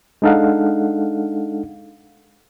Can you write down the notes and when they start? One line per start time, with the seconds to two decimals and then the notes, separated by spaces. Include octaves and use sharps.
0.22 G#3 D4 D#4 A4 F5 F#5